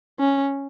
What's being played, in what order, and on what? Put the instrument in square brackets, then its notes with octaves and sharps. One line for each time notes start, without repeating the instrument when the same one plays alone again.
[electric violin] C#4